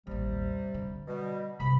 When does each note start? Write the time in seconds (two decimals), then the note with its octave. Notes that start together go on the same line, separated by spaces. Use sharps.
0.07 A1 D#2 C3 G3
0.74 D3
1.07 B2 G3
1.60 G1 C2 B5